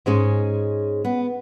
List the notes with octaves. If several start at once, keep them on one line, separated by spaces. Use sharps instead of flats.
G#2 G#3 C#4
B3